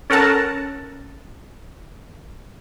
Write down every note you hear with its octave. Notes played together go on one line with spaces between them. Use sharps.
C#4 A4 A#4 F#5 A5 A#5